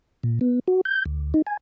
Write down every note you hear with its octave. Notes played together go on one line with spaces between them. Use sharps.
A#2
B3
F#4
G6
D2
D#4
G#5